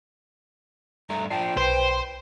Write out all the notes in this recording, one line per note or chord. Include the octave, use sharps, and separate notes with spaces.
G2 A3 A#5
F3 D4 G5 A5 C7
B1 B4 C5 B5 C6